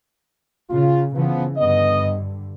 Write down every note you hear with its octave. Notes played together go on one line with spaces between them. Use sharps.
C#3 F4
C#3 E3 F3 B3
G2 D3 B3 D#5